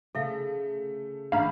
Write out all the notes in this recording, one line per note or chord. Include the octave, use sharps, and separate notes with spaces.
C#3 A3 A4 E5 F5
A1 D4 F5 A#5 B5